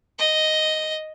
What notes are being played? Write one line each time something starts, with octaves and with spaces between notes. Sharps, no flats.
D#5